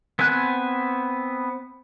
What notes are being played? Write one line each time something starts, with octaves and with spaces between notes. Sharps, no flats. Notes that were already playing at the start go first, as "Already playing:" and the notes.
B3 C4 B4 G#5 F#6